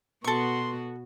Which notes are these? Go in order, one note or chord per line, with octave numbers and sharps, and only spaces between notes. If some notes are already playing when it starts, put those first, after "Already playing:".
B2 B3 F#4 A4 C6 C#6